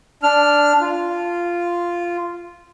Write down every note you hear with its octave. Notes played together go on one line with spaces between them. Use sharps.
D4 F6
F4